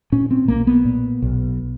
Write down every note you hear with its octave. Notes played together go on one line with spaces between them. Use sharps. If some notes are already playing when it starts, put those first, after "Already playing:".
A#2 C#4
C4
B1 A#3
B3
A#2
B1